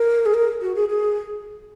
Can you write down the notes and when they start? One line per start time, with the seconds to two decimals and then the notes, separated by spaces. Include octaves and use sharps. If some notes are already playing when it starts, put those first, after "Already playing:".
Already playing: A#4
0.26 G#4
0.34 A#4
0.62 F#4
0.75 G#4
0.89 G#4